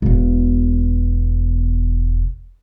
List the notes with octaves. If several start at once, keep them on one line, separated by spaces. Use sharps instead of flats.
E1 B2